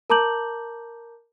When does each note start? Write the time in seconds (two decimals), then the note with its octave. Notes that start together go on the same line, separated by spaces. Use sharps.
0.10 A#4 A5 A#5 D6 G6 F#7